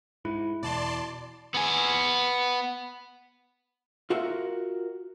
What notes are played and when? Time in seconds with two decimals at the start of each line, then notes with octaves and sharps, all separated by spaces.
0.25 G#2 E4
0.63 E2 B2 D5 A5 C6
1.54 B3 G#5
4.10 F4 F#4 A#4 E5